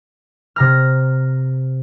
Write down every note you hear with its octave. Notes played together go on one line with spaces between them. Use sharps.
C3 A#5 F6